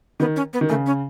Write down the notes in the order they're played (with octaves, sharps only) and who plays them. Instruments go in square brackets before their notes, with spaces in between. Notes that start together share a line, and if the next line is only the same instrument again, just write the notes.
[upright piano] D#3 [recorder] B3
[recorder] C#4
B3
[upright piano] D#3
[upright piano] C#3 [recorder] A3
[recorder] C#4